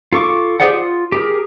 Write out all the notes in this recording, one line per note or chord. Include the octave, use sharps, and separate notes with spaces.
F4 A4 C#6 D6
G4 G#4 C5 D5 F#5
F4
G4 G#4 A#4